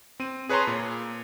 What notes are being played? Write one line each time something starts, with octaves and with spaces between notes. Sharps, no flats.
C4 D#7
G#4 B4 C#5 A5 A#5 C6
A#2